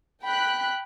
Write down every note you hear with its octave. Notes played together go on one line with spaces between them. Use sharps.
G5 B5 F#6